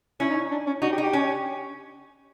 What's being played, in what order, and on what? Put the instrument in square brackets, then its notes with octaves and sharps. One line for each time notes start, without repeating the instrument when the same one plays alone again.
[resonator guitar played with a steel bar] C#4 [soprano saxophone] E4
[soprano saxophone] D#4
D4
C#4
[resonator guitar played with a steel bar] D#4 [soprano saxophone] F#4
[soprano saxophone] G4
[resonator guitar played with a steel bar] D#4
[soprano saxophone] G4
[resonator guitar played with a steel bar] C#4